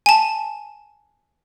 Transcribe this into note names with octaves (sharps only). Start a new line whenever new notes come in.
G#5 A5